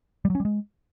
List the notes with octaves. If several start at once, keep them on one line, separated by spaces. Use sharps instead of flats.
G3
F#3
C#4
G3
G#3